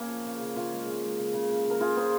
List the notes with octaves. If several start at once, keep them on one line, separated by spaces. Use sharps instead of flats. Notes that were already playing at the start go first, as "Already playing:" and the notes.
Already playing: A#3 C#4
F3
C#3
C#3
C#3 C#4 F4
G#3
C#3
G#3
C#3
C#3
C#3
C#3 A#4
C#3 F4 G#4
C#3 G#4 C5